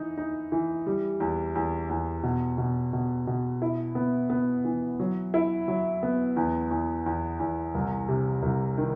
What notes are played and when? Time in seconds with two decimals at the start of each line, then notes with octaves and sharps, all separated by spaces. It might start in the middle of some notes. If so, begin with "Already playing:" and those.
Already playing: E3 D#4
0.17 D#4
0.52 E3
0.87 G3
1.20 E2
1.55 E2
1.89 E2
2.23 B2
2.58 B2
2.93 B2
3.27 B2
3.62 E4
3.95 B3
4.30 B3
4.65 E3
5.00 F#3
5.34 E4
5.68 F#3
6.03 B3
6.36 E2
6.71 E2
7.06 E2
7.40 E2
7.75 C2
8.08 C3
8.43 C2
8.77 D#3